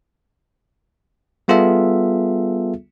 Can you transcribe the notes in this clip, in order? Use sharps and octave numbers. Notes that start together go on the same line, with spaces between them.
G3 B3 F4 G#4 A4 E5